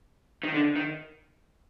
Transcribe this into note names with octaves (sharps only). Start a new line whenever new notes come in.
D#3
D3
D#3